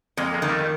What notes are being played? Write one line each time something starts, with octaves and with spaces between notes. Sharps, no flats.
F2 G#3 A#3
G#3 A#3
D#3
G3 A3